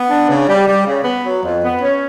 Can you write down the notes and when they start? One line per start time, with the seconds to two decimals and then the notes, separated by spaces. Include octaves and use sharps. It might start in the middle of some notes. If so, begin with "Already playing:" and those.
Already playing: B3
0.10 D4
0.28 C#3
0.48 G3
0.67 G3
0.86 C#3
1.04 B3
1.23 F#3
1.43 F2
1.62 B3
1.81 C#4